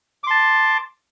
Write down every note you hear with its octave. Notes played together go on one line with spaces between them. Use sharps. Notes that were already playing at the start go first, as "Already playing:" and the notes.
A5 C6 D6